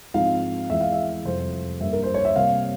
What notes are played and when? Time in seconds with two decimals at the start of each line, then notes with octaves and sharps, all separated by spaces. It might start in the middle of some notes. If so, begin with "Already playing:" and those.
0.14 G#2 F3 C4 F5
0.70 E2 E3 G#3 E5
0.81 F5
0.92 E5
1.25 F2 C3 G3 C4 C5
1.81 G2 G3 A#3 C#4 E5
1.93 A#4
2.03 C5
2.14 C#5
2.25 E5
2.36 C3 G3 A#3 F5